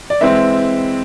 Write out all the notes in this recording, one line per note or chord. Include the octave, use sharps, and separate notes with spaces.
D5
E3 G#3 C4 E5